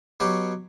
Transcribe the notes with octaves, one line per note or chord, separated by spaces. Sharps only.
B2 F#3 C#4 G4